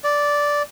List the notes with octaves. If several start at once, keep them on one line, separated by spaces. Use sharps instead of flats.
D5